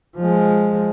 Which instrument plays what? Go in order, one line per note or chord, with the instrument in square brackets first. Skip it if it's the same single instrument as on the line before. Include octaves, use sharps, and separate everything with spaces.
[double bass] F3 G#3